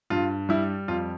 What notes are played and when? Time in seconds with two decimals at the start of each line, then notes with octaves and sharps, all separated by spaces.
0.10 G2 F4
0.49 G3 E4
0.88 F2 F4